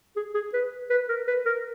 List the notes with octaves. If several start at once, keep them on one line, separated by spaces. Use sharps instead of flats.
G#4
G#4
B4
B4
A#4
B4
A#4